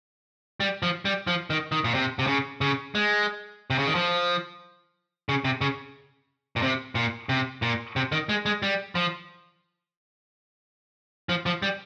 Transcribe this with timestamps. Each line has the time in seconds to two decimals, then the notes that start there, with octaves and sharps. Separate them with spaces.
0.60 G3
0.83 F3
1.05 G3
1.27 F3
1.50 D#3
1.72 D#3
1.84 A#2
1.94 C3
2.19 C3
2.27 C#3
2.61 C#3
2.95 G#3
3.70 C3
3.79 C#3
3.87 D#3
3.95 F3
5.29 C#3
5.45 C3
5.61 C#3
6.56 A#2
6.62 C3
6.95 A#2
7.29 C3
7.62 A#2
7.96 C3
8.12 D#3
8.29 G#3
8.46 G#3
8.62 G3
8.95 F3
11.29 F3
11.46 F3
11.63 G3